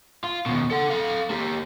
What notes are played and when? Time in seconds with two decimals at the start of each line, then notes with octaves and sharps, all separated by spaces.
0.24 F4
0.46 D#2 B2
0.71 A4 F#5
0.90 A4 F5
1.30 A#3 G4